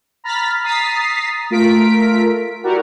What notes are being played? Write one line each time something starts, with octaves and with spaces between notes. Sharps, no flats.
A#5 B5 F6 A6 B6
A#5 D#6 A6 B6 C7
A3 F4 A#4 B6 D7
E4 F#4 G4 A#4 D5 F#5